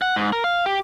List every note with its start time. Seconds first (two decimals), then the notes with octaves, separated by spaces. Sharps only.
0.02 F#5
0.16 G#2
0.33 A#4
0.44 F5
0.66 G4